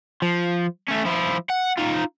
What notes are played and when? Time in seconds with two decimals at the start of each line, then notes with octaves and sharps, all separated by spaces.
0.22 F3
0.88 A3 C#4
1.05 F3 E4
1.50 F#5
1.78 D#4 F4